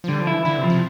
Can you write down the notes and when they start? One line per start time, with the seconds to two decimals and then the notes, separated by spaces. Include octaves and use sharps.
0.04 F3
0.08 D3 G3
0.21 F3
0.27 E4
0.33 E3
0.45 D3 E4
0.58 C3
0.64 F3
0.70 C3